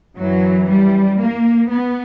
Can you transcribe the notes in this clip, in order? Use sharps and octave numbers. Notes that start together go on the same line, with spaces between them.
F#2 E3 F#3
G3
A#3
B3